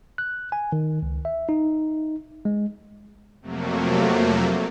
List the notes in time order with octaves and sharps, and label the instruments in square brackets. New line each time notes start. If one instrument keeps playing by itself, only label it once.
[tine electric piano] F#6
G#5
D#3
C#2
E5
D#4
G#3
[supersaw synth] F2 C3 F#3 A3 A#3